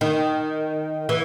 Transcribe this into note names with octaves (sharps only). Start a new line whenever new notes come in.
D#3
E3